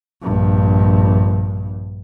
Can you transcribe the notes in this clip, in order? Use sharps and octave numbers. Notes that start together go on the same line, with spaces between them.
A#1 G2